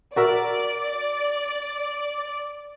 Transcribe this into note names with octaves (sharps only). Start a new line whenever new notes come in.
F#4 A#4 D5 E5